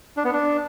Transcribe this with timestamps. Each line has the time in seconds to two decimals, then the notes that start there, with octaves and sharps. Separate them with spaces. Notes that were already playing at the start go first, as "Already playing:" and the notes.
0.17 D4
0.25 B3
0.33 D4